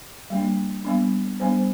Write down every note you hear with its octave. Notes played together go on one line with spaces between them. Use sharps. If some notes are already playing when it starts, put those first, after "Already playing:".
G3 A#3 D4
G3 B3 D4
G3 B3 D4 C5